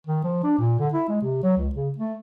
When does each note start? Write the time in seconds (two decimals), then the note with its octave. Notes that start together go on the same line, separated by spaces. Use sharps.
0.07 D#3
0.24 F3
0.44 D4
0.58 A#2
0.80 D3
0.94 E4
1.09 G#3
1.22 C3
1.43 F#3
1.57 C#2
1.75 C#3
1.98 A3